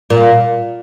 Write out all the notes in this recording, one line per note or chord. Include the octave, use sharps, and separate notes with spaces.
A#2